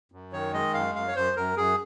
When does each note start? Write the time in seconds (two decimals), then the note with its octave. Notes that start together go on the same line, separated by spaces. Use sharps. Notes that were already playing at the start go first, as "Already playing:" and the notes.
0.12 F#2
0.33 D#3 C#5
0.53 G#3 D#5
0.74 F#2 F5
0.95 F#2 F5
1.08 C#5
1.16 F#2 C5
1.36 F#2 A#4
1.57 F#2 G#4